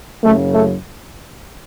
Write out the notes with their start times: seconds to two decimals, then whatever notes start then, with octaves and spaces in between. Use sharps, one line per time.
0.24 F#1 F#2 C#3 F#3 A3
0.55 A3